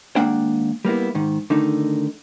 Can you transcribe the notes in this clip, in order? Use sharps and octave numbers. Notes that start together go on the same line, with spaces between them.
D#2 G#3 A#3 D4 F#5 G5
G3 A#3 B3 E4
G#2 D#3
D3 D#3 A3 D#4